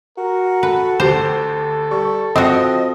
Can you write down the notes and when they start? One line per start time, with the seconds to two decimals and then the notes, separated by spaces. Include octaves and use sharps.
0.18 F#4 A#4
0.63 A4 B4
1.00 D2 G4 C5
1.91 G3 C#6
2.36 F3 C4 F#4 D#5